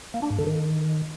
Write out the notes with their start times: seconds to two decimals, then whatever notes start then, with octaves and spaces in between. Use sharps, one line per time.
0.14 A#3
0.22 D4
0.30 G#2
0.39 D3
0.47 D#3